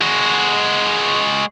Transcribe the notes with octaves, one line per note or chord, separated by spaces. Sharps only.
G#3 F#4